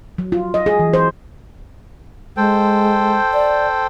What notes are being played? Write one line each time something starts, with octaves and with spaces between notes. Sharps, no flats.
F#3
F4
D#5
G#4
E3
C5
G#3 A4 C5 G5
D5